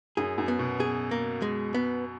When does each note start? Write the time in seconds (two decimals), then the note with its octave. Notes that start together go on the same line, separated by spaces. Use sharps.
0.17 F#2 G#4
0.38 F#2
0.48 B3
0.59 B2
0.80 G#4
1.11 A#3
1.42 G#3
1.74 B3